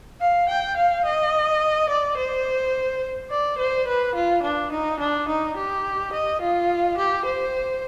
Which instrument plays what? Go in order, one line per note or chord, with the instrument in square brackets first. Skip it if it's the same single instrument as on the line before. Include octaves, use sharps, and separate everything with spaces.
[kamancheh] F5
G5
F5
D#5
D5
C5
D5
C5
B4
F4
D4
D#4
D4
D#4
G4
D#5
F4
G4
C5